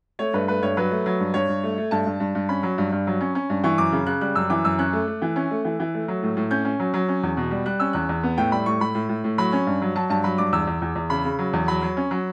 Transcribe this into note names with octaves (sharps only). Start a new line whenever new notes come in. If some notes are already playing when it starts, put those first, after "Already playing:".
A3 C#5
G2 B4
A3 B4
G2 C#5
F#3 B4
A3
F#3
G2
G2 C#5
G2
A3
A3
G2 A5
G2
G2
G2
C#4 B5
F#3
G2
G2
F#3
C#4
C#4
G2
E3 C#6
F#2 D6
C#3
C#3 F#6
G3 F#6
F#2 E6
E3 D6
F#2 E6
C#4 F#6
A3
A3
E3
C#4
A3
E3
E3
A3
F#3
A2
A2
C#4 G6
C#4
F#3
F#3
C#4
E2
B2
G3
G3 F#6
C#4 E6
E2 F#6
E2
B3
A2 G5
G3 B5
A2 C#6
A2 B5
A2
A2
A2
F#3 B5
C#4
G2
F#3
F#3 A5
G2 A5
F#3 B5
G2 D6
E2 E6
E2
E2
E2
C#3 B5
C#3
F#3
E2
F#3 B5
F#3
C#4
F#3